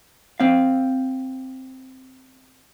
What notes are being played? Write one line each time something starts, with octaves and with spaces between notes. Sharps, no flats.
C4 F5